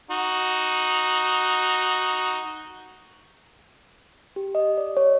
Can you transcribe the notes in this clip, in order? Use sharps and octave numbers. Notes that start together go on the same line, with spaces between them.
D#4 F#4
G4
D#5
D5
C#5